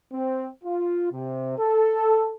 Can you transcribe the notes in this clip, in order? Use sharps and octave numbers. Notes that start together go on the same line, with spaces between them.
C4
F4
C3
A4